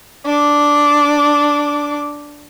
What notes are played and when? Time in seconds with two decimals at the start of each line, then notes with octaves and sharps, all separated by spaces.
0.25 D4 D6